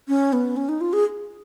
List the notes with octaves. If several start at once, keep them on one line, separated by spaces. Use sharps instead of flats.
C#4
B3
C#4
D#4
F4
G#4